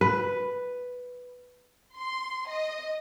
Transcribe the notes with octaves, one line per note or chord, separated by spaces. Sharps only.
B4
C6
D#5